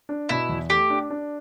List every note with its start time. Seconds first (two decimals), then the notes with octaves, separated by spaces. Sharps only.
0.09 D4
0.29 B2 E4
0.49 E2
0.69 A3 G4
0.90 D4
1.10 D4